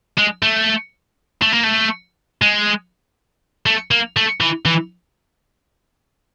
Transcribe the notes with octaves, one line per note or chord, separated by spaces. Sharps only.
G#3
A3
A3
A#3
A3
G#3
A3
A#3
A3
E3
E3